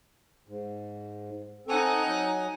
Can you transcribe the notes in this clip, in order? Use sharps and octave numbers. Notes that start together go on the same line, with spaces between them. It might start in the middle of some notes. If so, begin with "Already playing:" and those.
G#2
C4 D#4 A4 F#5 G#5
F#3